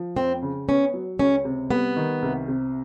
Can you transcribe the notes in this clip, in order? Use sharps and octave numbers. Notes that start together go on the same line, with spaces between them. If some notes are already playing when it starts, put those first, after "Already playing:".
Already playing: F3
F2 C4
C#3
B3 C#4
F#3
C#2 C#4
C3
G3 B3
D#3
C2
C3